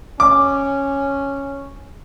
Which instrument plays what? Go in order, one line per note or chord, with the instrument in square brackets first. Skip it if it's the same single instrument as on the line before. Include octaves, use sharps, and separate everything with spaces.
[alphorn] C#4 [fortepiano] D6